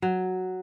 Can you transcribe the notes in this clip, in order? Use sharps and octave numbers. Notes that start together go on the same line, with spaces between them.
F#3